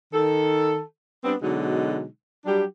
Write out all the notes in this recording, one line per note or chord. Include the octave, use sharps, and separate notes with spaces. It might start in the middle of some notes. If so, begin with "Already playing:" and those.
D#3 A4
G3 B3 C4 D4
B2 D3 F#3 G#3 D#4
F#3 G3 D4 G4